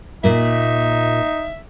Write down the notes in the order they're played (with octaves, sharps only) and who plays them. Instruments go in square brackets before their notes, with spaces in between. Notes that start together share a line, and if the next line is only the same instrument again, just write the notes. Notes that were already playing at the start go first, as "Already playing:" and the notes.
[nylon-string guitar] A#2 A#3 [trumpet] D#4 [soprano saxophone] E5